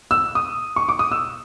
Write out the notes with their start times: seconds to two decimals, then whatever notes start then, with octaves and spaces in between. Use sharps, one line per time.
0.11 E6
0.35 D#6
0.76 C#6
0.89 D6
0.99 D#6
1.12 E6